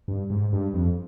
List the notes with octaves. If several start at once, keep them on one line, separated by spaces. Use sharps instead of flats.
G2
G#2
G2
F2